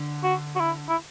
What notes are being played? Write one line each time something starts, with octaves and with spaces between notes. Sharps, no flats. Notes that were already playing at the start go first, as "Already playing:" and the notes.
Already playing: D3
F#4
F#4
E4
E4